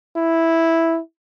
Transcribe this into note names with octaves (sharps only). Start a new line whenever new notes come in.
E4